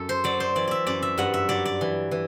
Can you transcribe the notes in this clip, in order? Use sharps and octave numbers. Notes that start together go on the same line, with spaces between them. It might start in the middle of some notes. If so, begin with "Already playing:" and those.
Already playing: F#2 A4
C5
F#3 D5
C5
E3 D5
D5 E5
F#2 D5
E5
G2 F#5
E5
F#3 D5
D5
E3
E3